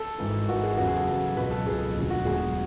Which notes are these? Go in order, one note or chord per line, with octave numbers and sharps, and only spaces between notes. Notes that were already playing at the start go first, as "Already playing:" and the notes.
Already playing: A4
G#1 G#2 E3
G#1 G#2 E3 F#4
G#4
E2 C#3 F#3 F#4
G#4
A4
E2 C#3 F#3
C#2 B2 F#3 B4
A4
C#2 B2 F#3 G#4
E1 D2 D3 F#3
F#4
E1 D2 D3 F#3 G#4